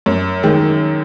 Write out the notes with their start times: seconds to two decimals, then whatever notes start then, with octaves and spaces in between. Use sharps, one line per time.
0.06 F#2
0.43 D#3 G#3